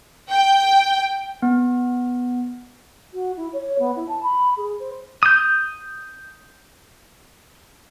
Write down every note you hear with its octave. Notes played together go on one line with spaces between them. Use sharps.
G5
B3
F#4
E4
C#5
B3
E4
A5
B5
G#4
C5
D#6 G6